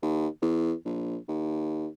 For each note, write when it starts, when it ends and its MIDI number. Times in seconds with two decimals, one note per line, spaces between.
0.02 0.28 39
0.42 0.73 40
0.85 1.17 34
1.28 1.88 39